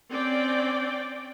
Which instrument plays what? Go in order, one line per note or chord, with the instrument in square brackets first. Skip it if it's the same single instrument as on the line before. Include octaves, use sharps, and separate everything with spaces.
[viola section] C4 C#4 D5 G5